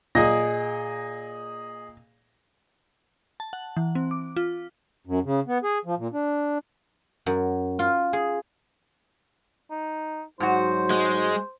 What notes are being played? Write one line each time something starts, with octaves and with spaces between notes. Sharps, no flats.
A#2 G#4 D#5 A#6
A5
F#5
E3
C4
D6
F4
F#2
C#3
B3
G#4
F3
A#2
D4
F#2
F4
G#4
D#4
G#2 F#3 D#4 F#4 C5
G#3